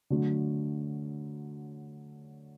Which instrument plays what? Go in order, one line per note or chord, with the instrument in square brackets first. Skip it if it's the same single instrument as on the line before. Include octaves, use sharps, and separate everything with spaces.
[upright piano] D3 F#3 A3